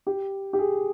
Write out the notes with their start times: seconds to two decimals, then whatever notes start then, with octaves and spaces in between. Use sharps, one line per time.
0.07 G4
0.53 G4
0.59 G#4